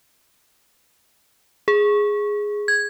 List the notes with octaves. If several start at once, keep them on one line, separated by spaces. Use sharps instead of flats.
G#4
G#6